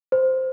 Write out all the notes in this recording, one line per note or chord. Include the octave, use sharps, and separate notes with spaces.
C5